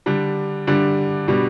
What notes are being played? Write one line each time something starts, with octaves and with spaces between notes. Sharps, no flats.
D3 G3 D4
D3 G3 D4
B2 G3 D4